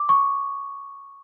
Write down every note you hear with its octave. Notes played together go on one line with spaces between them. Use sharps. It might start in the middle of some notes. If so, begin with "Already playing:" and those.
Already playing: D6
C#6